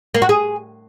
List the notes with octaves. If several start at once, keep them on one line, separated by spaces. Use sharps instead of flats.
A#3
F#4
G#4